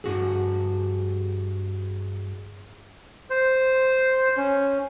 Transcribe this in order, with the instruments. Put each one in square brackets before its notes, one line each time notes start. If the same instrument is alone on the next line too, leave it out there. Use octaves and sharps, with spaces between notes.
[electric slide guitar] G2 F#4 G#4
[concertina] C5
C#4